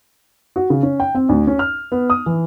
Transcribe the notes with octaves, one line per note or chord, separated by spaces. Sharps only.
F#4
C#3
C#4
G5
C4
D2
C#4
F6
B3
D#6
E3